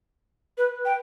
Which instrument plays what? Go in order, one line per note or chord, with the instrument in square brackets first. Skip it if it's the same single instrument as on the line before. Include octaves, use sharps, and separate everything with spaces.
[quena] B4
G5